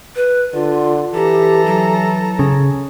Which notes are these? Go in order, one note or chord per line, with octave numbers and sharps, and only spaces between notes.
B4
D3 F4
E3 G4 A4 A#5
F#3
C#3